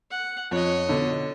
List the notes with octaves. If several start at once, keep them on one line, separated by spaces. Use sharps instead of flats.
F#5
F2 C#5 D#5
B2 D3